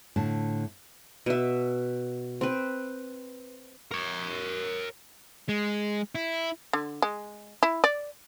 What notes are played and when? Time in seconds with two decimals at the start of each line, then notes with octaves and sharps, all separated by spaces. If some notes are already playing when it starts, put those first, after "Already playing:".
0.16 A2 D3 A5
1.26 B2 E5
2.41 C4 B4
3.91 A#4 C#5
5.49 G#3
6.15 E4
6.73 D3
7.02 G#3
7.63 E4
7.84 D5